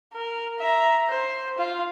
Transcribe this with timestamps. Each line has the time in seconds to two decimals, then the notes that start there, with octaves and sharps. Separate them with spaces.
0.13 A#4
0.59 E5 A#5
1.09 C5
1.58 F4